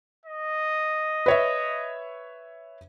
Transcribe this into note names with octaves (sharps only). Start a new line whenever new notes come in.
D#5
B4 C#5 E5